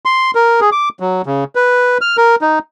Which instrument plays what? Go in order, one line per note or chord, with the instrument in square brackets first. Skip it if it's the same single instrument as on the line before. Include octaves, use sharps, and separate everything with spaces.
[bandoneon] C6
A#4
G#4
D6
F#3
C#3
B4
F6
A#4
D#4